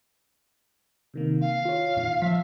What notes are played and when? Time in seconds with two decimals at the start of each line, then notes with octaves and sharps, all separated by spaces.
1.14 C3 D#3 A#3
1.41 F5
1.65 F4 C#5
1.96 D#2 A#2 D#3
2.22 F3 E5 B6